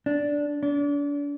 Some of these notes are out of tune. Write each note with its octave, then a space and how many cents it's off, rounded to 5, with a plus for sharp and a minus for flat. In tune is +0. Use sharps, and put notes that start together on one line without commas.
D4 -10
D4 -35